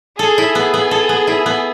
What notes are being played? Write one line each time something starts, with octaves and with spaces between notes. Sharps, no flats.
G#4 A4
E4
B3 G#4
B3
A4
B3
E4
B3